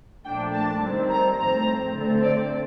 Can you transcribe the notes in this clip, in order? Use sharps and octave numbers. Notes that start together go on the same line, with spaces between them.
A#2 F3 A3 D4 G5
A5
D#3 G3 C4
A#5
A2 F3 C4 A#5
D3 A3 C4
D5